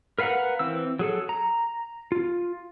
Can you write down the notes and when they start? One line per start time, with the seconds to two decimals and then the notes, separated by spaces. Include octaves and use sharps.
0.18 A#4 B4 F5 F#5 A#5
0.59 E3 C4 E6
0.99 F#3 G#4 A4
1.29 A#5
2.12 F4